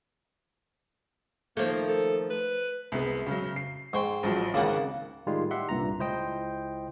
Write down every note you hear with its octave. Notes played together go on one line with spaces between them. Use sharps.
D#3 F3 A3 A#3
A4
B4
C2 G#3 B3
C#3 F#3
C7
G#2 C5 G5 C#6
A1 F3 F#3
G#1 C#2 C#3 A#3 F#5
A2 D#3 G3 G#3 F4
G4 E5 F#5 C6
C2 G2 A#2 A#5
C#2 E4 C5 D#5 G5